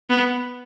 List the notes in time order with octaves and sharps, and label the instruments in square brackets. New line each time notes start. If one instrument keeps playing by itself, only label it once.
[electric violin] B3